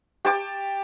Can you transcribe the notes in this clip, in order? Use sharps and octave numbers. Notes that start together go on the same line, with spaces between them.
G4 A5 D6